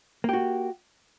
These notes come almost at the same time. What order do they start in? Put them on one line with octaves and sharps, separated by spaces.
A#3 G4 F#4